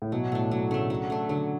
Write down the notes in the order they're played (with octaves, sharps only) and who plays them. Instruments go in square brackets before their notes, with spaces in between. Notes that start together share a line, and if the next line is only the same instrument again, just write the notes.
[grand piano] A2
[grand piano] B2 [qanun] F#3
[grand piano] A2 [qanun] A3 D4
[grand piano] B2 [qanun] F#3
[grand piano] C#3 [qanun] A3 D4
[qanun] F#3
A3 D4
[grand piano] D3 [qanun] F#3